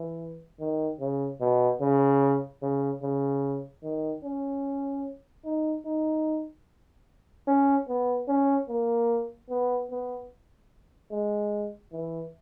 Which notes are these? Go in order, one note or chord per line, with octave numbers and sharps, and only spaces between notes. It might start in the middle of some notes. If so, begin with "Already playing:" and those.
Already playing: E3
D#3
C#3
B2
C#3
C#3
C#3
D#3
C#4
D#4
D#4
C#4
B3
C#4
A#3
B3
B3
G#3
E3